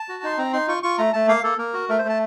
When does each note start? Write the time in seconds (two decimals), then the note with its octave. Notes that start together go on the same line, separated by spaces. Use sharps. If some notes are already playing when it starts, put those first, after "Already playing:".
Already playing: A5
0.09 F#4
0.23 D#4 C6
0.38 C4 A#5
0.53 D#4 C6
0.68 F4 C#6
0.83 F4 C#6
0.98 A3 A#5
1.13 A3 A5
1.28 A#3 F5
1.43 A#3 A4
1.58 A#3 A#4
1.74 F#4
1.89 A3 A#4
1.98 C5
2.05 A3 A5